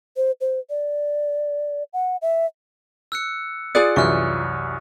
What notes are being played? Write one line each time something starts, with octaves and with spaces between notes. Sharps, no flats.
C5
C5
D5
F#5
E5
E6 F#6 C#7
F4 G#4 D5 D#6 F#6 C#7
C2 F#2 E3 C#6 F6 F#6